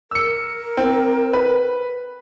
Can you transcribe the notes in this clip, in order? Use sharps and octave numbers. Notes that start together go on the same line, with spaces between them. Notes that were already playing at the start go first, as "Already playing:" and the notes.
A#4 E6 C#7
C4
B4